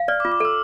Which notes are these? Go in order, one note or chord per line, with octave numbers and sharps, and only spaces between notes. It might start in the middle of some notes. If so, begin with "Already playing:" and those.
Already playing: F5
D5 F6
D6
F4
D6
A4 E6